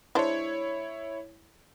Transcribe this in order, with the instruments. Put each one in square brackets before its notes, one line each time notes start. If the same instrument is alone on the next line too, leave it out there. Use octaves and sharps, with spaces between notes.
[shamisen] G#3 D4 C5 [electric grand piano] E4 C#5